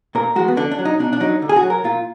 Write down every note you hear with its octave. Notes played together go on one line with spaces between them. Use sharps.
A#2 A#4
F3 G#3 F#4
B3
D3 D4
D4
F#3
D#4
B2 D4
D4
F#3 D#4
D3
G#4
F#4
F#3
A#4
A#2 F4